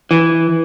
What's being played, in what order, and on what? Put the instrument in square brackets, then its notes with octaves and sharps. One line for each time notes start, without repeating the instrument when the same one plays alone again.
[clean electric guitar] E3